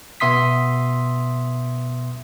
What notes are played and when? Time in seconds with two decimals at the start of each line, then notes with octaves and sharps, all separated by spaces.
0.20 B2 B3 E5 C6 D#6 B6